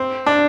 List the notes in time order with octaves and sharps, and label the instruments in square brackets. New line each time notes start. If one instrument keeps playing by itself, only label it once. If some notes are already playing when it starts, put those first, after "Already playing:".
Already playing: [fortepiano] C4
D4